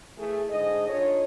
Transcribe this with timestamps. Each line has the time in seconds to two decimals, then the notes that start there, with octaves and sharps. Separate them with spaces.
0.18 E3 A3 G#4
0.50 G#2 D3 G#4 D#5
0.89 D4 D#4 F4 A4 C#5